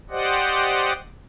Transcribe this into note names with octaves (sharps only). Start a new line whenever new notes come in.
G4 C5 D5 D#5 F#5